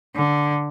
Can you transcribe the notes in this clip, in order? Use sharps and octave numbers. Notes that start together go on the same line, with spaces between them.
D3